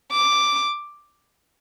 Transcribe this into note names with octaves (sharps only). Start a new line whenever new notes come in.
D6